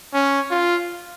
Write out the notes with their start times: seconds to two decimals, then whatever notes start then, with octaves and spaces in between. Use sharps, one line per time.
0.14 C#4
0.51 F4